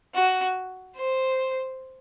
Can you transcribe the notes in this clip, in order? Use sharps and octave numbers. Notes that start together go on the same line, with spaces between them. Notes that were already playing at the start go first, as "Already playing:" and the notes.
F#4
C5